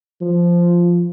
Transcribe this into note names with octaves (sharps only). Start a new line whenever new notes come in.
F3